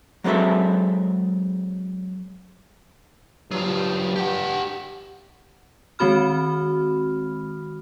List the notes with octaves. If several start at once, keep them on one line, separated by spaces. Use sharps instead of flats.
F#3 G#3 C4 A4 E5
G2 F#3 F4
G4 F#5
D#3 G#3 C4 F#4 B5 F6